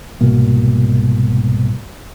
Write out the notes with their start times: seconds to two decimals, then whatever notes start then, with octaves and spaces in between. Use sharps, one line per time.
0.21 C2 G#2 B2 A#3